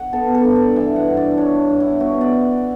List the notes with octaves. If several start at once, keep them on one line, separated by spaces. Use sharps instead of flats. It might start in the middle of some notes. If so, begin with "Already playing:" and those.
Already playing: F#5
B3 A4
A4
G2
D5
E3 E5
F#5
G2
D5
D4 C#5
G2
E4
B3 F#4
D5